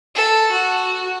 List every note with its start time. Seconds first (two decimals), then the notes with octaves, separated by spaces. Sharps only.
0.15 A4
0.51 F#4